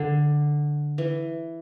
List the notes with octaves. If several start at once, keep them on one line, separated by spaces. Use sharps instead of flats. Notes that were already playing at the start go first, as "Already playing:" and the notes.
Already playing: D3
E3